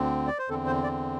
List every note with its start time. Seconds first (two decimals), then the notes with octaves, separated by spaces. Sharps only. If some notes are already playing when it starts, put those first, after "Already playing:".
Already playing: D2 D3 C4
0.27 D5
0.39 C5
0.49 E2 D3 C4 A4
0.66 C5
0.83 D5